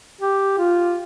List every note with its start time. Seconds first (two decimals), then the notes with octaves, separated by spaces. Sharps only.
0.21 G4
0.59 F4